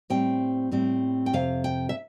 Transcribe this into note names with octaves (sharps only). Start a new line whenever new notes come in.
A2 G3 C4 G5
A2 G3 C4
G5
F2 C3 F5
G5
E5